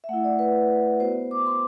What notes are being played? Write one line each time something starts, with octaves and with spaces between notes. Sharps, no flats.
E5
A3 E4 F#5
D5
B4
B3 F#4 C5
D6
C6